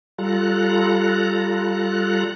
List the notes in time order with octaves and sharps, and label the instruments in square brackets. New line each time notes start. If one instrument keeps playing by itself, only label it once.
[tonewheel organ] G3 F4 A4 A#5 F#6